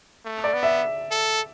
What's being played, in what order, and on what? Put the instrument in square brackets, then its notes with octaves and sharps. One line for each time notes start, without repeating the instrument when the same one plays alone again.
[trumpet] A3
[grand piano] D5
[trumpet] B3
[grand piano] E5
[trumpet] A4